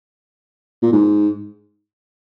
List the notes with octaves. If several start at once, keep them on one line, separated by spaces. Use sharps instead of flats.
A#2
G#2